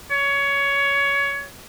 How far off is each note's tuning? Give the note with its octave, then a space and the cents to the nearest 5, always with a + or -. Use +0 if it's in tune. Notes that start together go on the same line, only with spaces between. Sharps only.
C#5 +20